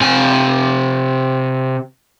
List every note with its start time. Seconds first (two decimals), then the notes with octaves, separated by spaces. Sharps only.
0.01 C3 G#5